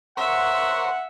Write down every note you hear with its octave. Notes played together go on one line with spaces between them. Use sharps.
A#4 C5 C#5 E5 F#5